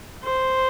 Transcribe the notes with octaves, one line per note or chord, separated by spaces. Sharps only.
C5